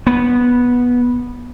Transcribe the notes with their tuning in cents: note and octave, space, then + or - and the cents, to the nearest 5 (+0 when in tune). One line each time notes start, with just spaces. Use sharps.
B3 -10